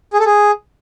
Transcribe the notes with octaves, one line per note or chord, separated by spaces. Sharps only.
G#4
A4
G#4